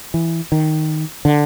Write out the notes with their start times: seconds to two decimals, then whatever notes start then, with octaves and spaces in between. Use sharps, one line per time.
0.14 E3
0.52 D#3
1.25 D3